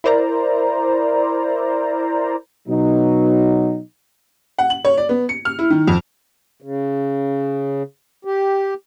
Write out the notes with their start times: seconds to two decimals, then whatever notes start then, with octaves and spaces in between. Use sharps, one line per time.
0.04 E4 A#4 C5 D5 A#5
2.68 B2 F#3 D#4
4.58 F#5
4.70 F#7
4.85 C#5
4.97 D5
5.09 B3
5.29 C#7
5.45 F6
5.59 E4
5.71 D#3
5.87 F2
6.62 C#3
8.25 G4